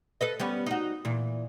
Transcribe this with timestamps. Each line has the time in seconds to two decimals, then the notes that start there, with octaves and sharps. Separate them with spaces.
0.21 A4 B4 D#5
0.40 G3 B3 C#4
0.66 D#4 F#4
1.05 A#2 E3